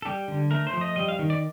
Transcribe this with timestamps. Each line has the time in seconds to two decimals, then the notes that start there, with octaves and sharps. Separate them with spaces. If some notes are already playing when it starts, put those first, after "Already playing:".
0.02 A4
0.05 G3 G4
0.28 D3
0.51 A3 A#4
0.67 C5
0.73 F3
0.81 D#5
0.96 G3 D#5
1.08 F5
1.19 D#3
1.30 D5